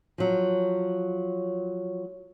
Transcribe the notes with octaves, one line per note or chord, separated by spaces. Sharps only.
F3 F#3